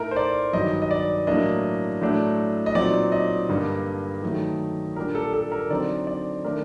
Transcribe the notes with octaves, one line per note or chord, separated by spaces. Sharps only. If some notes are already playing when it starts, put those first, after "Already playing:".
Already playing: A2 A3 D#4 A#4
C5
D5
G2 D#3 F#3 D#5
D#5
D5
A2 F#3 A#3 D4 D#5
A2 F#3 A3 D4
D#5
A#2 F#3 C4 D#4 D5
D#5
G2 D3 G3 A#3
D#3 F#3 A3
A#2 G3 D4 A#4
A4
A4
A#4
D3 F#3 C4 D#4 D5
D5
D#3 A3 D4 A#4